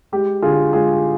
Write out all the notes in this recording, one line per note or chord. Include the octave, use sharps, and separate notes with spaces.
G#3 G4
D3 F4 G#4
G#3 F4 G#4